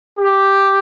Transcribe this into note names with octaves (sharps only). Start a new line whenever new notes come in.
G4